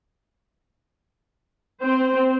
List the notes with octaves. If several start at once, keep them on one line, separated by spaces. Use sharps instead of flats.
C4 C5